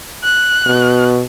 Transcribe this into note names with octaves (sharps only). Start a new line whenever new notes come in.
F#6
B2